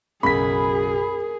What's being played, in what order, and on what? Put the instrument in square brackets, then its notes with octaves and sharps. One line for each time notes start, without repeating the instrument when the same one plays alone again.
[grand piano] B1 F#2 C#3 [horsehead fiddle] G#4 [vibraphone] A#4 [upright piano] B5 B6